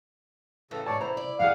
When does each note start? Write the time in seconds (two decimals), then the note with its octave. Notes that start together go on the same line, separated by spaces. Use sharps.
0.71 F#2 A2 C#3 E3 A4
0.86 G#2 C#5 D5 A5
1.01 C2 E4 C5 A#5
1.17 D5
1.40 F#2 E3 G3 G#4 F5 F#5